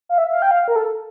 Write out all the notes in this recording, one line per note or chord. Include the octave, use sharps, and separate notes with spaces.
F5
E5
F5
G5
F5
A#4
A4